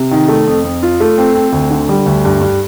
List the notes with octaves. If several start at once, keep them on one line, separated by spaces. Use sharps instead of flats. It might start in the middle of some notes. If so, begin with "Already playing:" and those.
Already playing: C3
D#3
A3
F2
F2
F4
A3
C4
C4
D2
D3
G3
D2
G2
G2